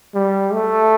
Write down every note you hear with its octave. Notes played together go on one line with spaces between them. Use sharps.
G3
A3